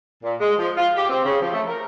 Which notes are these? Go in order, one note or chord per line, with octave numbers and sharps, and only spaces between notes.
A#2
G#3
F3
F4
G4
C4
C#3
F3
A3
A#4